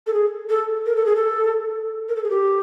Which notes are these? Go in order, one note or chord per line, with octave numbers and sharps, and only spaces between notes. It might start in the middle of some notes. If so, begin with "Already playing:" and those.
A4
G#4
A4
A#4
A4
G#4
A4
A#4
A4
G#4
G4